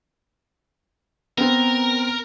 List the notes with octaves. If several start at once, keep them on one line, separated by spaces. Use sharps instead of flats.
B3 C4 A#4